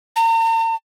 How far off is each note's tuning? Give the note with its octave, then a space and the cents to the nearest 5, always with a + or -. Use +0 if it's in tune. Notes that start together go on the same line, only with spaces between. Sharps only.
A#5 -45